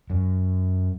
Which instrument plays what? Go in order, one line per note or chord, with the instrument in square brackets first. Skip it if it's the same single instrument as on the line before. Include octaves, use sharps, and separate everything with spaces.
[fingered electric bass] F#2